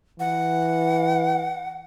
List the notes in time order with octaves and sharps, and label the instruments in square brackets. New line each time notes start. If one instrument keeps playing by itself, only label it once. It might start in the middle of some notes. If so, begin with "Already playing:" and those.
[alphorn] E3 [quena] F#5